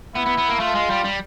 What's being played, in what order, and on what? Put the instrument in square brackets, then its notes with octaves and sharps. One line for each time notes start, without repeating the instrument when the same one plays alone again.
[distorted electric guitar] B3 [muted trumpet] E4
[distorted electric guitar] B3
B3
A#3
[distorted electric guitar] A3 [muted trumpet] F4
[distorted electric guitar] G#3
G3
G3